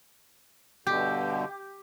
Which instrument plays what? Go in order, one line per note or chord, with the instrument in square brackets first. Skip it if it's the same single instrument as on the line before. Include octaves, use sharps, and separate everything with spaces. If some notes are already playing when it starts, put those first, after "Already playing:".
[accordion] G2 B2 D3 [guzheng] G4